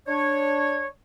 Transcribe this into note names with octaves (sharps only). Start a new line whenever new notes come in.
D4 C#5